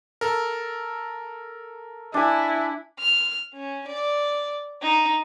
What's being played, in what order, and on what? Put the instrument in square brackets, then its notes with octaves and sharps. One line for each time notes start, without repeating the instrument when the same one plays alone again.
[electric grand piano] A4 A#4
[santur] D4 G#5 [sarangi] E4
[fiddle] F6
C#4
D5
D#4